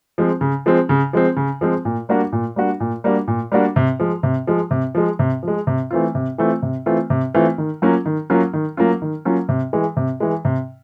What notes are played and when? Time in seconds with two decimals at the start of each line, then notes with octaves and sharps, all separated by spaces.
0.18 F3 G#3 C4
0.41 C#3
0.66 F3 G#3 C4
0.89 C#3
1.13 F3 G#3 C4
1.37 C#3
1.61 F3 G#3 C4
1.85 A#2
2.09 G3 A#3 D4 F#4
2.32 A#2
2.56 G3 A#3 D4 F#4
2.80 A#2
3.04 G3 A#3 D4 F#4
3.28 A#2
3.52 G3 A#3 D4 F#4
3.76 C3
4.00 F3 G#3
4.23 C3
4.47 F3 G#3
4.71 C3
4.95 F3 G#3
5.19 C3
5.43 F3 G#3
5.67 C3
5.91 E3 A3 C4 F4
6.15 C3
6.38 E3 A3 C4 F4
6.62 C3
6.86 E3 A3 C4 F4
7.10 C3
7.34 E3 A3 C4 F4
7.58 D#3
7.82 F#3 A#3 C#4 F4
8.06 D#3
8.30 F#3 A#3 C#4 F4
8.54 D#3
8.77 F#3 A#3 C#4 F4
9.02 D#3
9.25 F#3 A#3 C#4 F4
9.49 C3
9.73 E3 G#3
9.97 C3
10.20 E3 G#3
10.45 C3